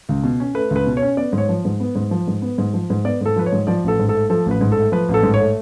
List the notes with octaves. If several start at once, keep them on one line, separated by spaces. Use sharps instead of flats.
C#2
B2
C#4
A3 B4
C#2
B4
B2
C#5
C#4
B3 D5
G#2
C#5
F3
G#2
B3
G#2
F3
G#2
B3
G#2
F3
G#2
B3 D5
G#2 A4
F3 B4
C#5
G#2
F3 D5
A1 A4
G#2
A3 A4
F3 A4
A1 B4
G#2
A4
A3
F3 B4
A1
A4
G#2
C#5
A3